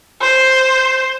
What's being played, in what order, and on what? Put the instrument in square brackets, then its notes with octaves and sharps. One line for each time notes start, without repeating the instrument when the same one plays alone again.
[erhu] C5